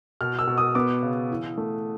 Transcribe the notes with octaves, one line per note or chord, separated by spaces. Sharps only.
B2 F6
E6
B2
D#6
B3 D6
C#3
E3
A3